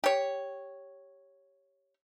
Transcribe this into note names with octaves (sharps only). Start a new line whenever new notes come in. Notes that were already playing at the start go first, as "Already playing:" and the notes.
G4 C#5